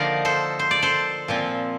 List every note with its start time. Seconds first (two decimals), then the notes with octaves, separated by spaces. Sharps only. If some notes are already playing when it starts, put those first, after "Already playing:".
Already playing: D3 F3 A#3 D#4 A#4 D5
0.25 A4 C5
0.59 C5
0.71 D5
0.82 A4 C5
1.28 A#2 F3 C4